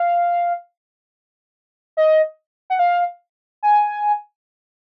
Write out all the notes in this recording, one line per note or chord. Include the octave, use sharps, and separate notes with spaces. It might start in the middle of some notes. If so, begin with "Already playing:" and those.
Already playing: F5
D#5
F#5
F5
G#5